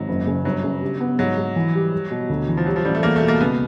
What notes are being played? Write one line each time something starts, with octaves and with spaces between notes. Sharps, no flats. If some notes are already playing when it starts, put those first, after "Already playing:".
Already playing: G#1 F#3
F#1
C#3
G1 F#3
C#3
G3
B3
G#2 F#3
G#2
E3
G3
G3
B2
D2
E3
F3
F#3 G3
F3
A1 G3
A3
E2 A#3
A3
B2
A#3
C#2 B3